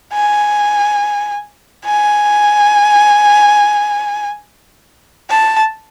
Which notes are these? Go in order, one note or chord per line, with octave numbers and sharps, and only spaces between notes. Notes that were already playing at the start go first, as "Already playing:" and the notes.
G#5
G#5
A5